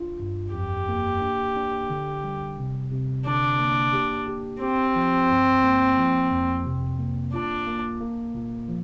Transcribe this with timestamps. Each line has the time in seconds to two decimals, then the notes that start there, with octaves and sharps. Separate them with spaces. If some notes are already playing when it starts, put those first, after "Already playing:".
Already playing: D4 F4
0.20 G2
0.54 F2 G4
0.89 A#3
1.22 D4
1.56 D4
1.90 D3
2.24 G3
2.58 C3
2.92 C3
3.26 D3 D4
3.60 A#3
3.93 G4
4.27 G4
4.61 C4 G4
4.95 F3
5.30 G2
5.63 A#3
5.97 F3
6.32 F2
6.65 C3
6.99 A#3
7.33 D4 F4
7.67 A#3
8.01 A#3
8.35 A#2
8.68 F3